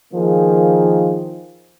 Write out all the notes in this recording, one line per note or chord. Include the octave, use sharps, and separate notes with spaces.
D#3 F3 A#3 G#4